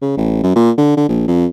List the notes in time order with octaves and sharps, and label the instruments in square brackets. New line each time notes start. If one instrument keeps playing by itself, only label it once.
[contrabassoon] C#3
A1
F#2
A#2
D3
D3
A#1
F2